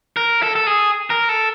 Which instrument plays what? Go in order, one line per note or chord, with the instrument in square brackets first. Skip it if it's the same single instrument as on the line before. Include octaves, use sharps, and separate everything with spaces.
[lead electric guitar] A#4
A4
A4
G#4
A#4
A4